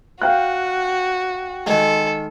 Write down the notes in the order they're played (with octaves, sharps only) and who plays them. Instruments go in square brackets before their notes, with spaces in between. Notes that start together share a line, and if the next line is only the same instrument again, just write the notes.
[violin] F#4 [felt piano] F5 G5 F#6
[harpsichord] D#3 G#3 [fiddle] A4